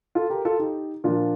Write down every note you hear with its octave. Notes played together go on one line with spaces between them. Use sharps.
F4 A4
G4 A#4
F4 A4
D#4 G4
A#2 F3 D4 F4